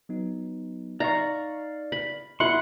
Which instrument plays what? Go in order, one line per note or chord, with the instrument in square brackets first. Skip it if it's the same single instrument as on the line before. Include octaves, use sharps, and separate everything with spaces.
[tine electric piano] F#3 B3 D#4
[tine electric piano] D#4 [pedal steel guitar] D5 F5 C#6 [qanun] A#5
[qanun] B5
[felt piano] E4 [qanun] F#5 [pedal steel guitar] B5 C6